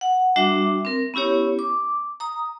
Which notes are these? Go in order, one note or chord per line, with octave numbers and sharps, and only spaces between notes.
F#5
G3 D4 F#4 E5 D6
C4 A#4
B3 C#4 E4 G4 C#5
D6
A#5 D#6